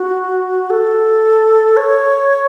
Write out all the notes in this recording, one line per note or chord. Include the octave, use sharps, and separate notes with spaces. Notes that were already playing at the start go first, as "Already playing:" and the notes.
Already playing: F#4
A4
C#5